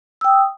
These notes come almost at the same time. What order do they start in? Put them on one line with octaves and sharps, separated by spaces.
E6 G5 D#6